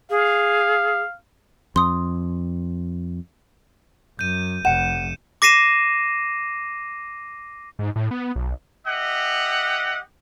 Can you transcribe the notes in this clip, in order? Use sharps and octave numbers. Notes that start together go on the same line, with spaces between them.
G#4 F5
F2 C6 D#6
F#2 G6 D#7
F1 F#5 C#7 E7
D6 A#6 C7 D#7 E7
G#2
A2
B3
B1
G4 D#5 E5 F#5